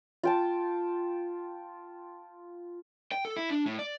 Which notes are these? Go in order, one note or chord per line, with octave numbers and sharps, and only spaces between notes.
F4 G5 A5
G5
A4
E4
D4
A2
D5